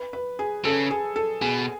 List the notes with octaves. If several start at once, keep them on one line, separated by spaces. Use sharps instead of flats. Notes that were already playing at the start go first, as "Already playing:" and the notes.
Already playing: B4
B4
G#4
C#3 A4
G#4
A4
B2 G#4